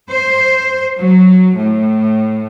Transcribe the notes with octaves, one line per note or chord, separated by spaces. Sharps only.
C5
F#3
A2